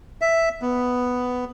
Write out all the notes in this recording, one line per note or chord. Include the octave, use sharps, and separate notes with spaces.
E5
B3